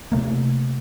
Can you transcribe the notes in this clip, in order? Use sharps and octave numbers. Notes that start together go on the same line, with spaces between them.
C3 A3 A#3